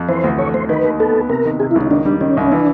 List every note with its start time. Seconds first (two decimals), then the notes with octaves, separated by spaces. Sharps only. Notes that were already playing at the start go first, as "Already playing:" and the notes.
Already playing: F2
0.08 E3 C5
0.24 D2
0.38 A3 C#5
0.54 D2 C5
0.69 D#3 B4
0.84 D#2
1.00 B3 A4
1.15 B3
1.29 C3 A#4
1.45 D#3
1.60 C3 G#4
1.71 E4
1.75 C#2
1.81 D#4
1.90 D#3 D4
2.05 G3 D4
2.21 D#3 C#4
2.37 C2 C#4
2.52 E3 D4